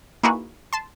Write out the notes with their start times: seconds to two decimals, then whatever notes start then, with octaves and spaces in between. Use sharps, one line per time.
0.23 A#3 D#4 E4 F#4 G#4 B4
0.73 A5 C6